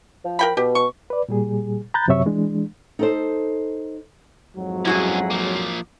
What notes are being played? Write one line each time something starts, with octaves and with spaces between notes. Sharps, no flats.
F3
A#4 G5 B5
B2 G4
C#6
B4 D5
A#2 G3 G#4
A#5 B5 F#6 G6 A6
F#2 C3 F#3 C#5 E5 C#6
E3 G#3 D4
D#4 A4 C5
F2 G#2 F#3
G2 C#4 E4 F#4 G#4
F3 A#3